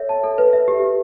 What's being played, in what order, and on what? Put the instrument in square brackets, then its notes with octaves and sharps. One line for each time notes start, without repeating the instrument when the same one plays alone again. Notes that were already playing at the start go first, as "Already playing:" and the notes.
Already playing: [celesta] A4 C#5 E5
A5
A4
B4
E5
G4
G4